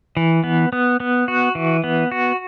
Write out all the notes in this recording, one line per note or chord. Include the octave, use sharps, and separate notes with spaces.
E3
B3
B3
B3
F#4
E3
B3
F#4